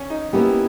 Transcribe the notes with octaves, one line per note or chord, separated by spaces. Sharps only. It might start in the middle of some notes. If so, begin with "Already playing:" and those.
Already playing: C#4
D#4
A#3 B3 C#4 E4 G4